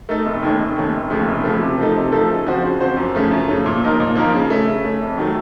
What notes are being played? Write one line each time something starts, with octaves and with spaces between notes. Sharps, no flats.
A3 D#4 A4
F1
D#2 D#3 A3 C#4
F1
D#2 D#3 A3 C#4
F1
D#2 C#3 F3 A3
F1
D#2 C#3 F3 A3
C3
F3 A3 D#4 A4
C3
F3 A3 D#4 A4
C#3
F3 C4 F#4 C5
C#3
F3 C4 F#4 C5
F#2
C#3 F3 A3 C#4
F#2
C#3 F3 A3 C#4
A#2
F3 A#3 D#4 A#4
A#2
F3 A#3 D#4 A#4
C#3
A3 C#4
C#3
A3 C#4
F2
D#3 F#3 A3